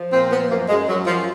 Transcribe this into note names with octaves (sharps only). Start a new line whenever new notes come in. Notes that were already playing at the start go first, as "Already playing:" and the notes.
Already playing: F3
A#2 C4
F3 B3
F#2 A#3
F#2 G#3
F#2 F#3
F#2 F3